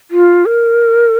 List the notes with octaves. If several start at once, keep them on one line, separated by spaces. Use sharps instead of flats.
F4
A#4